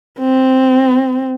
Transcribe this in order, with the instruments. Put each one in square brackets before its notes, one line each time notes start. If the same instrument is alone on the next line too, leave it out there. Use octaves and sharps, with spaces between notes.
[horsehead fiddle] C4